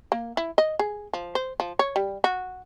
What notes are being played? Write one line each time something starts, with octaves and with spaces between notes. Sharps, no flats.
A#3
E4
D#5
G#4
F3
C5
F3
C#5
G3
F#4